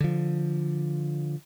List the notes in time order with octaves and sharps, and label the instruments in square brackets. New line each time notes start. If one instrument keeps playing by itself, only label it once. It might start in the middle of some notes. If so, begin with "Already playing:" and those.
[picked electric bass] D3 F3